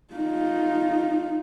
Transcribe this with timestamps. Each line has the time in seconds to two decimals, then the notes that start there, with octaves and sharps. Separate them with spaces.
0.14 D#4 F4